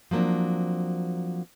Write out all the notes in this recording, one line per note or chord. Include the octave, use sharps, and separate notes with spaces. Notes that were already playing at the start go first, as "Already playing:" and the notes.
F3 F#3 A#3 C4 D4